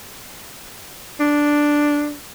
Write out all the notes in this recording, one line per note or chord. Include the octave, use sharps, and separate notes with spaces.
D4